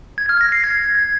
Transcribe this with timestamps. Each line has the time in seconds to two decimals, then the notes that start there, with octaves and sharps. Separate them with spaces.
0.18 G#6
0.29 F6
0.41 A#6
0.52 C7
0.64 G#6